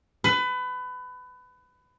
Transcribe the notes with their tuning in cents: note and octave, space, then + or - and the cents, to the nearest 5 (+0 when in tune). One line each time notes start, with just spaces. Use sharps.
B4 +25